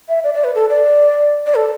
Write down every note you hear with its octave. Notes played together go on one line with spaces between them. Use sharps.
E5
D5
D5
B4
A4
D5
D5
A4